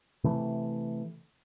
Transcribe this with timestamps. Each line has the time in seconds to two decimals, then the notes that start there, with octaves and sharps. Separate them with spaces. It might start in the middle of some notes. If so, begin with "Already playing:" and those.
0.24 C3 E3 A3